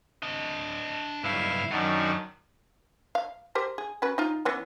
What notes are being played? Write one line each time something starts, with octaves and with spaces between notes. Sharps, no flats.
D4 D#5
B1 G2 E4 F5
F#2 D#3 F#3 D4
F5
G4 A#4 C5
G#4
C#4 F#4 B4
D#4 F4
E3 B3 C#4